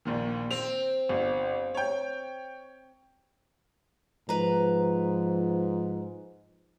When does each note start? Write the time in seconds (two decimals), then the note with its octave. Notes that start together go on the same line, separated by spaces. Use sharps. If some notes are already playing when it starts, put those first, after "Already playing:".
0.05 A#1 A#2 D#3
0.51 C4 F7
1.09 G1
1.75 C#5 G5
4.29 G#2 F3 B4 A#5